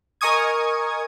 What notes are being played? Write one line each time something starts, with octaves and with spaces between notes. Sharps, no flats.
A#4 D#5 G#5 C#6 D#6 G#6